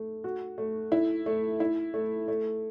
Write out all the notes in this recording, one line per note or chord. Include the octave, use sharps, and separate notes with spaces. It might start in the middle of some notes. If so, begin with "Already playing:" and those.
Already playing: A3
F#4
A3
E4
A3
E4
A3
A3